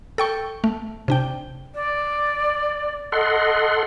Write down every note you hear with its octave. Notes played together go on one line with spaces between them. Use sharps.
A4 G5 C#6
A3
C3 D4 G5
D5
A4 D#5 F#5 C6